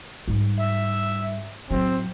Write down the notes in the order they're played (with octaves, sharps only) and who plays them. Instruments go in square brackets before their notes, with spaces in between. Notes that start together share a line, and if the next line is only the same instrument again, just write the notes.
[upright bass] G#2 G3
[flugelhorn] E5
[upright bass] A1 F#3 [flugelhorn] C4